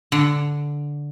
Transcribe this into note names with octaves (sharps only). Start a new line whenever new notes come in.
D3